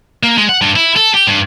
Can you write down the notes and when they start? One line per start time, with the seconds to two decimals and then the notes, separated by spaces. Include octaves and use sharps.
0.23 A#3
0.38 G#3
0.49 F#5
0.62 G2
0.76 E4
0.96 A4
1.14 G4
1.27 G2